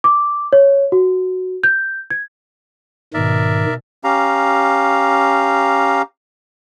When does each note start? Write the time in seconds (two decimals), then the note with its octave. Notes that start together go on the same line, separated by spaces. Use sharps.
0.04 D6
0.53 C#5
0.92 F#4
1.63 G6
2.10 G#6
3.14 G#2 B2 D#3 A#4 D5 E5
4.04 C#4 G4 F5 A#5